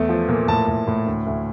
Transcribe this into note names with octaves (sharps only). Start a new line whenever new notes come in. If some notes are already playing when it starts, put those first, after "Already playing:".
Already playing: E2 A3
F3
A#2
A2 A5
A2
A2
D2
D2